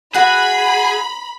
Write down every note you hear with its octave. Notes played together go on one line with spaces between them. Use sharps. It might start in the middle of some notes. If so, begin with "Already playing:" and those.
F#4 G#4 F#5 B5